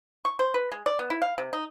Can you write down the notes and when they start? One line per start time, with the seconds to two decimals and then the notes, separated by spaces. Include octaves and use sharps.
0.25 C#6
0.39 C5
0.54 B4
0.72 G#3
0.86 D5
0.99 B3
1.10 E4
1.22 F5
1.38 C3
1.53 D#4